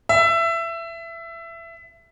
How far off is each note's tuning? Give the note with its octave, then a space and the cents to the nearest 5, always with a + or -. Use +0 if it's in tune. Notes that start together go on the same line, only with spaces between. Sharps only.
E5 +20